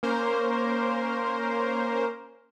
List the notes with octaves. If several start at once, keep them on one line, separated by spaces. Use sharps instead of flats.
A#3 C#4 A#4 C5